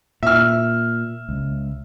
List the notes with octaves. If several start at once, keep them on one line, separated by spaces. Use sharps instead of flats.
A#2 E5 F6
C#2